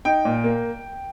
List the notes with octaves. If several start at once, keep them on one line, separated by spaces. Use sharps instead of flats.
D#4 G5
A#2
A#3